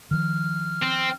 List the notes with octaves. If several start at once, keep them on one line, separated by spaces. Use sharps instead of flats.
D#3 F3 F6
C4